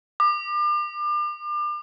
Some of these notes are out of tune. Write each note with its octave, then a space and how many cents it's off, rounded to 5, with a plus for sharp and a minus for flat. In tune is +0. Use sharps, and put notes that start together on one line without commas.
D6 +35